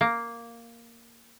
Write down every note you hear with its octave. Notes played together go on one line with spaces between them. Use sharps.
A#3